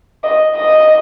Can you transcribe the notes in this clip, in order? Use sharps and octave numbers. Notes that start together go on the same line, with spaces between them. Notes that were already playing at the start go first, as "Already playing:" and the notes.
D#5
D#5